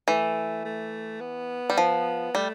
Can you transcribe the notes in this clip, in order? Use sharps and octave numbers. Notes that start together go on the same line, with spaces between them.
E3 A3
A3
B3
G3
F3
G3 A3